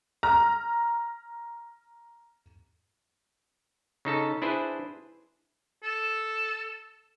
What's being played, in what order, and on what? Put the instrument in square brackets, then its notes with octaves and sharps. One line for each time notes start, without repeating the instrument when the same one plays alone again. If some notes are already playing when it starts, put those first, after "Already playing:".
[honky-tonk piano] A#5 F6
[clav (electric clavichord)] C#3 D#4 A4 A5
D4 E4 G#4 B4 C5
[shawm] A4